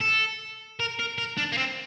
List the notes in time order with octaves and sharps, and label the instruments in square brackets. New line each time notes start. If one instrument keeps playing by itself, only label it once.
[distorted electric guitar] A4
A#4
A#4
A#4
D4
A#3
C4